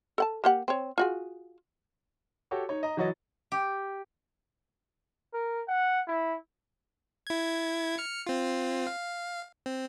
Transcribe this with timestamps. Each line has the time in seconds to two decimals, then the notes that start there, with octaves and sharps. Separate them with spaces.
0.18 A4 F#5 A5
0.44 A#3 G4 F#5
0.68 C4 C#5
0.98 F4 F#4 G#4
2.51 F#4 G4 A4 C#5
2.69 D#4 C#5
2.83 D#5 A#5
2.97 E3 F#3 F#4 C#5 D#5 A6
3.52 G4
5.33 A#4
5.68 F#5
6.07 E4
7.27 E4 G#6
7.98 F6 C#7
8.27 C4 F4
8.87 F5
9.66 C4